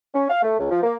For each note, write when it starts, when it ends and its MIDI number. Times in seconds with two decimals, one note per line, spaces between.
0.14 0.26 61
0.30 0.42 77
0.43 0.58 57
0.59 0.68 37
0.70 0.80 53
0.83 0.96 58